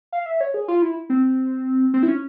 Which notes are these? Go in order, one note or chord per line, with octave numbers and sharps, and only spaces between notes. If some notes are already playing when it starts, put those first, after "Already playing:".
F5
E5
C#5
G#4
F4
E4
C4
C4
E4
C#4